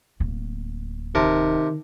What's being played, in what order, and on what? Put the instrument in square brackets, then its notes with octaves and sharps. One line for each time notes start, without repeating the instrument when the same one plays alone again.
[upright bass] D1 A#3
[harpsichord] C3 A#4 A5 [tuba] D#3